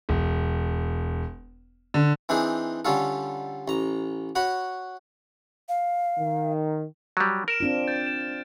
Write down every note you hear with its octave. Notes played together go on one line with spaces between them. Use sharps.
E1
D3
E3 C4 D4 D#4 G#4
D3 G3 C#4 F4 A4
A1 A#5
F#4 C#5 B5
F5
D#3
F#3 G3
A#4 F6 D7 E7
C4 D4 F4
G6 A6
E7